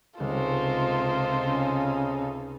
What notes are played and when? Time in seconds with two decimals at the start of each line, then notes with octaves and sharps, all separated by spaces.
0.20 C#2 C3 G#3 D#4 F4 A4 C5
1.45 C#3